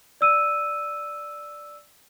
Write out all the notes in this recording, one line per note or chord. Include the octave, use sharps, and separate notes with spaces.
D5 E6 D#7